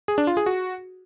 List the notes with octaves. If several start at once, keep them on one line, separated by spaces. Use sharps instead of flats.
G#4
D4
F4
G#4
F#4